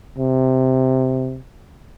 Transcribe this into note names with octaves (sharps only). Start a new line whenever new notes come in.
C3